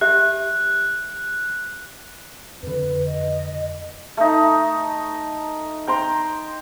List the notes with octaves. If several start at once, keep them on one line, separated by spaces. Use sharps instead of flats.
G4 E5 F#6
F2 D3 B4
D#5
A3 D#4
G5 A#5 C6